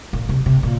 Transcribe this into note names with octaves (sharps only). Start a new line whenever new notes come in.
A#2
C3
C3
A#2